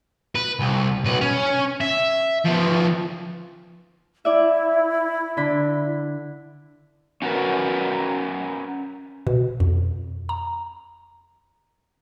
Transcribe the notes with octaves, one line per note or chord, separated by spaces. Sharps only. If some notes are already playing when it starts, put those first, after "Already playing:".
B4
C2
B1 B4
C#4
E5
F3 B3
E4 D5 E5
D3 B5
C#4 F#4 G4 A#4 B4
B2
F2
A#5